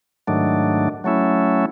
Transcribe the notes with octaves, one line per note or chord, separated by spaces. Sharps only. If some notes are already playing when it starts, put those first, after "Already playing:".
G#2 D#3 F#3 A3 D4
F#3 A3 C#4 E4